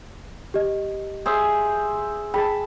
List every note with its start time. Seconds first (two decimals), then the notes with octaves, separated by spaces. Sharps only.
0.54 G4 D#5
1.26 G#4 C5 E5
2.34 G#4 G5 A5 B5